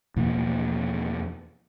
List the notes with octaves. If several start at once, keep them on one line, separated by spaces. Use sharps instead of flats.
E2 B2 F3 A#3